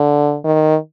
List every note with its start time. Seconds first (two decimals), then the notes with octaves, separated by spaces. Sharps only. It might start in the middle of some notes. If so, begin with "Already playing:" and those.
Already playing: D3
0.45 D#3